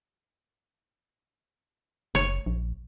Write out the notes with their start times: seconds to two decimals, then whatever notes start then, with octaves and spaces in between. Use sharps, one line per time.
2.15 F#1 C#5
2.46 A#1